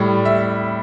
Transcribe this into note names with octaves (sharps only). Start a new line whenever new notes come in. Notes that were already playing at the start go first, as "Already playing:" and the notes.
Already playing: A2 G3
E5